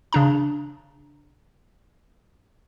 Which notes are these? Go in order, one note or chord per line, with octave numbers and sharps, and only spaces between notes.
C#3 D4 A#5